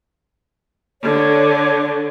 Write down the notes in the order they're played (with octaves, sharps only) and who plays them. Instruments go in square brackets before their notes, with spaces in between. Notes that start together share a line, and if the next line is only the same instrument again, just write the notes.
[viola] D3 [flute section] C#5